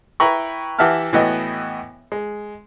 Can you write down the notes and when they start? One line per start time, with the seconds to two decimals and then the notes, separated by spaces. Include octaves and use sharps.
0.20 E4 B4 G5 A#5 B5 C#6
0.79 E3 G4 E5 F#5 A5 F6
1.13 A2 E3 B3 F#4 D#5 G5
2.12 G#3